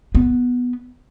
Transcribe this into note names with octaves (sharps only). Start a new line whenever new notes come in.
B3